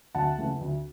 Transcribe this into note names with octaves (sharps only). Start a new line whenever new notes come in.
D2 F#5 A5
C#3 E3 A3
D2